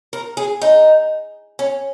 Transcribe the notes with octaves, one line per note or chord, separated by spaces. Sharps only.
A#4
G#4
D#4
C#4